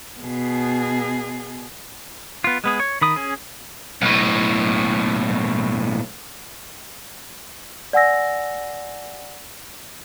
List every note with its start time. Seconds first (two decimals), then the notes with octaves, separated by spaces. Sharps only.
0.21 B2 G#4
2.44 B3 F4
2.64 G#3 B3 G#4
2.80 C#5
3.02 D#3 B5 D#6
3.16 C#4 G#4
4.02 B1 A2
7.93 D5 F#5 G#5 E6 A#6